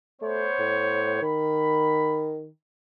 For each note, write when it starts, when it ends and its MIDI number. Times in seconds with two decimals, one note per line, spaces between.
0.21 0.46 57
0.21 1.21 59
0.21 1.21 72
0.21 1.21 73
0.59 1.17 45
1.22 2.48 51
1.22 2.25 83